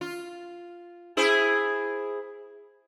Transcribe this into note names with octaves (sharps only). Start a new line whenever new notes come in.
F4
E4 G#4 C5